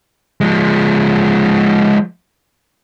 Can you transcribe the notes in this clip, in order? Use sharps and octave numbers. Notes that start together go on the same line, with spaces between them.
F3 G#3